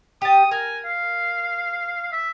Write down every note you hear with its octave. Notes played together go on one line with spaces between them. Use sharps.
G4 A5 D#6
A#4 G#5
F5
E5